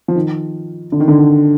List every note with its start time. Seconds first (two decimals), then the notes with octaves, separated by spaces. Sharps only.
0.08 F3
0.15 D#3
0.92 D3
1.00 D#3
1.08 D3